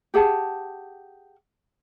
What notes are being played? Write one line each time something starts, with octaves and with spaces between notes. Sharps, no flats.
G4 G#4 F#5 A5